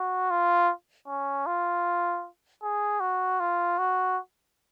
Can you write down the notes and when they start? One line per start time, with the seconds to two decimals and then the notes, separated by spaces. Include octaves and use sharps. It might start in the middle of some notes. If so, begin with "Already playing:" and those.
Already playing: F#4
0.31 F4
1.08 C#4
1.47 F4
2.63 G#4
3.00 F#4
3.40 F4
3.78 F#4